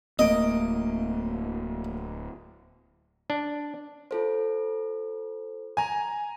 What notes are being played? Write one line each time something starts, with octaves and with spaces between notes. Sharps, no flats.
D1 A3 A#3 D#5 D7
D4
F4 A4 C5
G#5 A#5